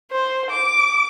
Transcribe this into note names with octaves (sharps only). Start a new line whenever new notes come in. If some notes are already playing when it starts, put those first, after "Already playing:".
C5
D6